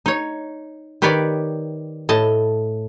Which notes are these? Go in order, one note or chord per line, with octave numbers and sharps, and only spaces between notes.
D#4 C#5
D#3 G4 B4 C#5 D5
A2 D#5 A5